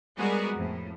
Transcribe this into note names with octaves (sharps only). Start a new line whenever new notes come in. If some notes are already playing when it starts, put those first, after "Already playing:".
G3 G#3 B3 F#4 G#4 A#4
F2 A2